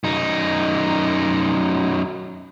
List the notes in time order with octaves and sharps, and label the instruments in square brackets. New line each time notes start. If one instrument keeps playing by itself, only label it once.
[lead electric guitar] F#2 D#4